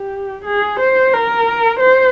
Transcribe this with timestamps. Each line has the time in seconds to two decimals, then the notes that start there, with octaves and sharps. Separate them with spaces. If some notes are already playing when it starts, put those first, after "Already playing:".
Already playing: G4
0.45 G#4
0.80 C5
1.14 A#4
1.81 C5